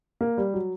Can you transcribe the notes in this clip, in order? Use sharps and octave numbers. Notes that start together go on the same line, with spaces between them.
A#3
G3
F#3